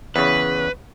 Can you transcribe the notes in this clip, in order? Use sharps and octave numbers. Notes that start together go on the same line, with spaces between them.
E2 C#3 B4